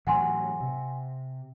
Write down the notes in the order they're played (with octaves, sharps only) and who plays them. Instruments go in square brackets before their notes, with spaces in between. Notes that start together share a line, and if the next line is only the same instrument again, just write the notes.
[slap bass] A2 E3 F#3 [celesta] F#5 G#5 C6
[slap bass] C3